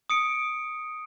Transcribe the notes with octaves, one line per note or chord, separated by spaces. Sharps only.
D#6 C#7 D7